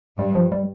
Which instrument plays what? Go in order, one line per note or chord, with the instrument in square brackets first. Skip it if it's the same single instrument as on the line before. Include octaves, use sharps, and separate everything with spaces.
[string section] G2 [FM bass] G3
[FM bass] F3
G3